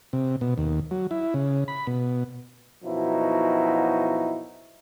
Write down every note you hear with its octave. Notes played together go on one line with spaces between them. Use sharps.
C3
B2
D#2
F#3
E4
C#3
B5
B2
F#2 B2 F3 D#4 E4 F#4